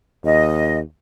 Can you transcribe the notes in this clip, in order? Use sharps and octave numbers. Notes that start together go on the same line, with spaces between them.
D#2 D#5